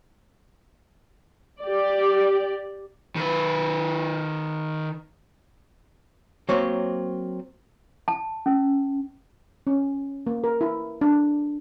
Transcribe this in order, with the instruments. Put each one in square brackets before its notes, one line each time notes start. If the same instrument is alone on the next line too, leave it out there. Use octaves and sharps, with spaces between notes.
[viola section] G4 D5
[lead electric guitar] D#3 B4
[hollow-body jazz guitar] F#3 A#3 C4 C#5
[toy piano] A5
C#4
[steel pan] C#4
A#3
A#4
E4
D4